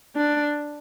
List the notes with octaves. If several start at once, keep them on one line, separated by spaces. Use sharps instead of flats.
D4